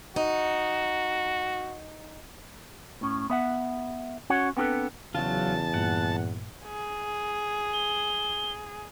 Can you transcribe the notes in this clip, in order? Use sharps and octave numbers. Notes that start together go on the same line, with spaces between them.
D#4 F#4
A2 C#4
B3 E5 F#5
C#4 F#4 C#5 F#5
B3 C4 D4 F#4 A4 B4
E2 C#3 F#3 F4 A5
G2 A#2 F#5
G#4
G7